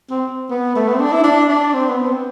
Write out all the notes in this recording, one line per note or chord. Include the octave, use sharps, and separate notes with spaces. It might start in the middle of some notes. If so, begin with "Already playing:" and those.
C4
B3
A3
B3
C4
D4
E4
D4
D4
C4
B3
C4